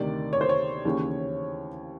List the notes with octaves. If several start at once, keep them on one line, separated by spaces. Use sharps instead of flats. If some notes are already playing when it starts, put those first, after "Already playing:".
Already playing: D2 C3 D#3 D5
C#5
C5
C#5
D#2 C#3 E3